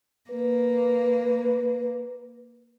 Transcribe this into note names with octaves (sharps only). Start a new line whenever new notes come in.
A#3 B4